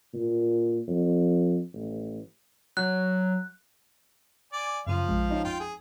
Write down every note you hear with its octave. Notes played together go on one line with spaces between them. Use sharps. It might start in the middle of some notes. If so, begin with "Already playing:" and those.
A#2
F2
A1
F#3 F#6
D5 G#5
F#2 C#3 F3 F5 D#7
A#1 G#3
C#4 D#4 D#5
F2 F4 G5
G#4